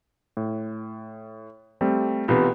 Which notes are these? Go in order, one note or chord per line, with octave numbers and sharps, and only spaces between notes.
A2
G3 A3 C4
B1 C3 E3 B3 F4